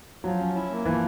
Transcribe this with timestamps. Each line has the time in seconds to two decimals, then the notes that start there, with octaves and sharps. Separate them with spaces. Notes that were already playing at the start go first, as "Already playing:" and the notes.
0.24 F3 F#3
0.40 C#4
0.55 E4
0.70 A#3
0.85 E3 F3